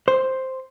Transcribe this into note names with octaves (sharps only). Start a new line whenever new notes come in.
C5